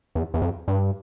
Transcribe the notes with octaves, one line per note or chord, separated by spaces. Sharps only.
E2
E2
F2
G2